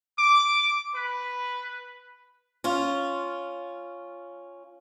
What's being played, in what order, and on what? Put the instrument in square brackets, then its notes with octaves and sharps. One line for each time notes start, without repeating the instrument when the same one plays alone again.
[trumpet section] D6
B4
[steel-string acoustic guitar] C#4 F4